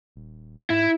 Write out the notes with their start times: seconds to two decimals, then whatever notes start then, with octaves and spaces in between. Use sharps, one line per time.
0.16 D#1
0.70 G#2 E4